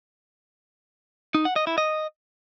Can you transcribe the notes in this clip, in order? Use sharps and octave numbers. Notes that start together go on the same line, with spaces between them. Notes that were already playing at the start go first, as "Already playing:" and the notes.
D#4
F#5
D#5
E4
D#5